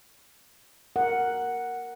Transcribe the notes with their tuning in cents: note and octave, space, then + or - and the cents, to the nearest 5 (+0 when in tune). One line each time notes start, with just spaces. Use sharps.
A#4 +0 F#5 +0